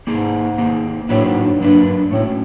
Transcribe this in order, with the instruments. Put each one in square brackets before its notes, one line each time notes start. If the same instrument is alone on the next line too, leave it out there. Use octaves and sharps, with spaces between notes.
[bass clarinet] G#2 [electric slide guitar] A#3 D#4 G#4
[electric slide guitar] A#3 D#4 G#4
[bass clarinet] A2 [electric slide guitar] F#3 A#3 D4 F#4 B4
[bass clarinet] G#2
G2
[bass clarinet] G2 [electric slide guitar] F#3 A#3 D4 F#4 B4
[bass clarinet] G2
[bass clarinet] A2 [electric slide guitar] A3 C#4 F#4